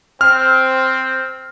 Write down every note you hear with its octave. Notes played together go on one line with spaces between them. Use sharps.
C4 F6